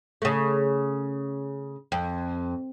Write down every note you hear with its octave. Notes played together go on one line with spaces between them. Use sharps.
C#3 A3
F2